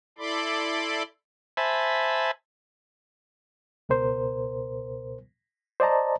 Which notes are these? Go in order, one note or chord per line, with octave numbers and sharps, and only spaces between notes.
E4 A4 D5 B5 C6 D6
C5 E5 G#5 A5 B5
C#2 B2 A#4 C5
C5 D5 D#5 A5 A#5